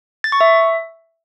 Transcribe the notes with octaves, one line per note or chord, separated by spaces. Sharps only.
A6
C#6
E5